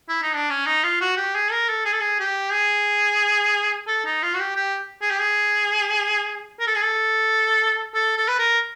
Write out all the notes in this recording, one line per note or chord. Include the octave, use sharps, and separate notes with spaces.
E4
D#4
D4
C#4
D#4
F4
F#4
G4
G#4
A#4
A4
G#4
A4
G#4
G4
G#4
A4
D#4
F4
F#4
G4
G4
G#4
G4
G#4
A#4
A4
G#4
A4
A4
A4
B4
A#4